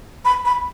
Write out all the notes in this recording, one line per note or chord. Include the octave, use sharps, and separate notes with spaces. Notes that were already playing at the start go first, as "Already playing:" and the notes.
B5
B5